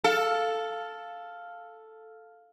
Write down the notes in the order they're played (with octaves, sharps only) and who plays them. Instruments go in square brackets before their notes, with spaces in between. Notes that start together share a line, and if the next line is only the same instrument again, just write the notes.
[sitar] A4 [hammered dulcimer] F5